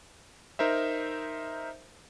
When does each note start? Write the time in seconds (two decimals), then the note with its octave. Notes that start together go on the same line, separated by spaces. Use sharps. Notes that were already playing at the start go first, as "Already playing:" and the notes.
0.59 D#4 A#4 C5 E5